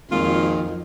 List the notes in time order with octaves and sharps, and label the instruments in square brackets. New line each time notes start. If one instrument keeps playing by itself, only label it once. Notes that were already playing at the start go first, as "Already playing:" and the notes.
[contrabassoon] G#1 [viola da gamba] F2 [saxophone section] A#2 D#3 [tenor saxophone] F4